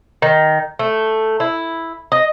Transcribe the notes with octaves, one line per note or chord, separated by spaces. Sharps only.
D#3
A3
E4
D#5